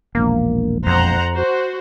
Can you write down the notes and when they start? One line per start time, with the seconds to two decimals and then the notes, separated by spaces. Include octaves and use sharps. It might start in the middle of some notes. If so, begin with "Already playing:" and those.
0.15 E1 A#1 A#3
0.86 F2 C5 F#5 A#5
1.34 F#4 C5